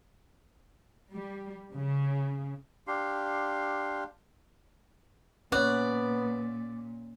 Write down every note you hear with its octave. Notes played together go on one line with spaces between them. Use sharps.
G3
C#3
D4 G4 F5 C6
A#2 B3 C#4 C#5 D5 F#5